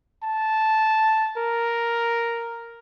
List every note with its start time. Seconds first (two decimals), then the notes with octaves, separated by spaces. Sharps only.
0.23 A5
1.37 A#4